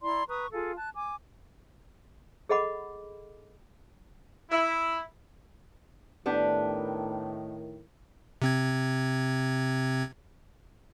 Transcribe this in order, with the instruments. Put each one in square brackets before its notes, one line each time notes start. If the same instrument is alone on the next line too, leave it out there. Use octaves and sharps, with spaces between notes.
[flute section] E4 D5 A#5 C6
B4 A#5 C#6 D#6
F4 G#4 A4 F5
A5 F#6
G#5 D6
[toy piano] G#4 A4 D#5 F#5 B5 D6
[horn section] E4
[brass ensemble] A2 D#3 [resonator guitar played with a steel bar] B3 D4 G4
[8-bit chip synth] C3 C4 G#6